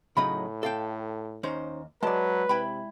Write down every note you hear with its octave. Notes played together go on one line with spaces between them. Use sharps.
A2 C#3 F#3 D#4 B5
A4 F5 G5
D#2 C#4 D#4 C5
F#3 G#3 B4 D5 A5
C3 E4 G5 B5